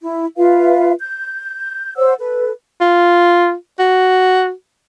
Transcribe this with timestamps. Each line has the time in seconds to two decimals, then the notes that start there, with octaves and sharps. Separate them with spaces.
0.02 E4
0.37 F4 B4 E5 F5
0.99 G6
1.96 C5 C#5 F#5 E6
2.19 A4 B4
2.81 F4
3.79 F#4